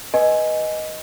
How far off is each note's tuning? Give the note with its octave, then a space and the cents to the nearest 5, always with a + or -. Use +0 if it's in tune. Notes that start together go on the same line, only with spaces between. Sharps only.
B4 -5 D#5 +0 G#5 +15